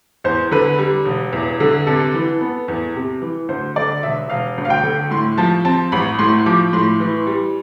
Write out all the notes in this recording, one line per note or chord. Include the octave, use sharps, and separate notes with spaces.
E2 C5
D3 B4
G3
E1
E2
D3
C3 A4
E3
B3
E2
C3
E3
D2 C5
D3 D5
E1 E5
E1 F5
D2
F5
G5
D3
A2 C6
F3 A5
C4 A5
A1 B5
A2 C6
F3 D6
A2 C6
E3
G3